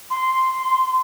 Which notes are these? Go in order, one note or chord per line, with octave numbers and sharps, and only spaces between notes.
C6